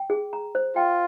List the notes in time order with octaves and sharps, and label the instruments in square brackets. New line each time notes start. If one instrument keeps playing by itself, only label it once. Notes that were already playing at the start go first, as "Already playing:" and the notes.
Already playing: [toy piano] G5
G#4
A#5
C5
[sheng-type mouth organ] F4 [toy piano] G5